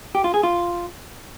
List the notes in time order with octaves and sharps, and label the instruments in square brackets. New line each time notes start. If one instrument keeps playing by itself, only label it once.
[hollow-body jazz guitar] G4
F4
G#4
F4